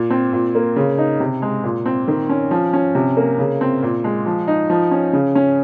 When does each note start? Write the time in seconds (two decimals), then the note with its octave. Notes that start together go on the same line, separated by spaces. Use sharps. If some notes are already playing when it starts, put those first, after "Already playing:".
Already playing: A#2
0.10 C4
0.33 A#2
0.55 A#3
0.76 C#3
0.98 D#4
1.20 C3
1.42 G#3
1.64 A#2
1.86 C4
2.08 D#3
2.29 C#4
2.51 F3
2.73 C#4
2.95 C3
3.17 A#3
3.39 C#3
3.61 C4
3.82 A#2
4.04 G#3
4.26 F3
4.48 D#4
4.70 F3
4.91 C#4
5.13 C#3
5.35 C#4